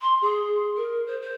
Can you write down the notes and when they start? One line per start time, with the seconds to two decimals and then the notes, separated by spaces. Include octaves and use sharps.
0.01 C6
0.22 G#4
0.76 A#4
1.07 C5
1.22 C5